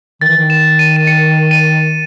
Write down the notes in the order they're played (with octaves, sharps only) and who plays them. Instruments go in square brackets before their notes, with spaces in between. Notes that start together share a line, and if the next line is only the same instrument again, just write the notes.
[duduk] D#3 [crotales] A6
[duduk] E3
D#3
[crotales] E7
D#7
D#7
C#7
D#7